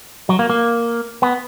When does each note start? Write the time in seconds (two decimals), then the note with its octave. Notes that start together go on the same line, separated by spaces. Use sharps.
0.29 F#3
0.39 A#3
0.50 A#3
1.22 B3